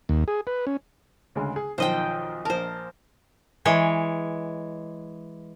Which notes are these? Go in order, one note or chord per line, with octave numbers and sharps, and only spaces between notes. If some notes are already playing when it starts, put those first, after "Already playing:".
D#2
G#4
B4
C#4
D2 C#3 G#3
G#4
B1 D#3 F3 C5 D#5 G5
A#1 A#4 C5 A5
E3 G#3 C#5